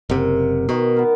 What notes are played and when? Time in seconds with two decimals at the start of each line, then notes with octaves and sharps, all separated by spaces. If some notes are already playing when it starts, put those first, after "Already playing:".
0.09 F#1 C3 A#4 F#5
0.69 B2 D#3
0.96 B3 A#4